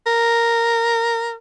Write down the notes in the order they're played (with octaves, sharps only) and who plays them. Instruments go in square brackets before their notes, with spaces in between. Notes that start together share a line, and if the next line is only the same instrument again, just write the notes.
[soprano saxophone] A#4